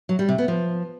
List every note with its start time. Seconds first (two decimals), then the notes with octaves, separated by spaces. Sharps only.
0.09 F#3
0.19 G3
0.29 C3
0.38 B3
0.48 F3